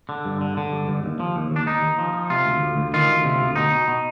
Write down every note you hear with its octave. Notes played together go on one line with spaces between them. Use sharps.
D3
G2
D3
D3
G2
G2
D#2
F3
D#2
D#2 D4
D#2 D#4
D#2
F3
F3
C3 F4
D2
D2
D2
D#3 F4
D2
C3
D2
B2 D#4
B2
B2